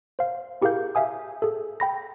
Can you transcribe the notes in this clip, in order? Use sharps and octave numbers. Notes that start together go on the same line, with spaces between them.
C5 F5
E4 G4 G#4 A#4 F5 G6
E5 F5 G#5 D#6
G#4 A4
G5 B5 A#6